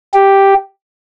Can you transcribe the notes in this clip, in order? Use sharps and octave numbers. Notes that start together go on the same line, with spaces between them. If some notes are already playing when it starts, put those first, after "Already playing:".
G4